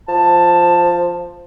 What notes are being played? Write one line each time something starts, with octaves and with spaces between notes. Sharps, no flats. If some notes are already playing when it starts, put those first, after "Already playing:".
F3 A5